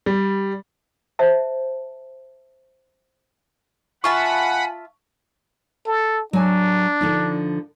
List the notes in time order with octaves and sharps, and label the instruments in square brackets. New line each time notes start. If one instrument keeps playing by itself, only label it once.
[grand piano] G3
[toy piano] C5 E5 A5
[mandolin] F4 E5 A5 [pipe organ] F#5 B5 [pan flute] G#5 [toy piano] C#6
[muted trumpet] A4
[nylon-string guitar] F#3 G#5 [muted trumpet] D4
[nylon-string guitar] D3 F3 D#4